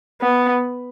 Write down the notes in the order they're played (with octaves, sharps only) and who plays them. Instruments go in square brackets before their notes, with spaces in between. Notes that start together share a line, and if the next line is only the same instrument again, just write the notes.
[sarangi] B3